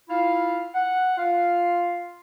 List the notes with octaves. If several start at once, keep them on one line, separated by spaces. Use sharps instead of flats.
E4 F4 F5
F#5
F4 F5